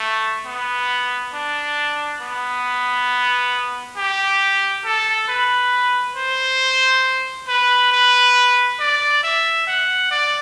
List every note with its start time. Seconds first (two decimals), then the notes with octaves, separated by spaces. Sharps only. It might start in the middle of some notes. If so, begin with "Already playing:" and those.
Already playing: A3
0.46 B3
1.33 D4
2.21 B3
3.97 G4
4.85 A4
5.28 B4
6.16 C5
7.48 B4
7.92 B4
8.80 D5
9.23 E5
9.67 F#5
10.11 D5